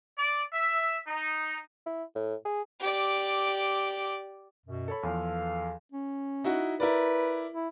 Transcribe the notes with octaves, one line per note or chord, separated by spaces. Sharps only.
D5
E5
D#4
E4
A2
G#4
G4 D5
F#2 B2
A4 C#5 B5
E2 F3 A4 F5
C#4
D#4 E4 F#4
E4 A#4 B4 D5
E4